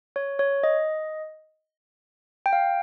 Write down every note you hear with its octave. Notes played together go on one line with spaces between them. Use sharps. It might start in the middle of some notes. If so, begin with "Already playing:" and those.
C#5
C#5
D#5
G5
F5